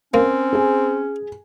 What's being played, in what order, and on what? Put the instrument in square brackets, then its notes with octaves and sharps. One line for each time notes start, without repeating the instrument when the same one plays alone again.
[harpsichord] A#3 [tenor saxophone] C4 [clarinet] C#4
[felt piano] G#4 G#5